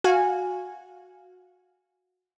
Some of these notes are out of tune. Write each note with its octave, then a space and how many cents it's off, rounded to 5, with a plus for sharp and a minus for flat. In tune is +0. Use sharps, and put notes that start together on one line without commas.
F#4 -15 F5 +0 G#5 -5